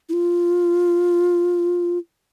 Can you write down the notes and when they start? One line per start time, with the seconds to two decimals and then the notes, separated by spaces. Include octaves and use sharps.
0.09 E4
0.13 F4